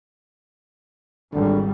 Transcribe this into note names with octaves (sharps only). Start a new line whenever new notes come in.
G#1 C#2 D3 G3